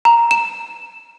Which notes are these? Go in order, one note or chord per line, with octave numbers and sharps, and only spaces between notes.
A#5
E7